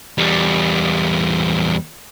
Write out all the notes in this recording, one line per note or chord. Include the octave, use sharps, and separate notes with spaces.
E2 G3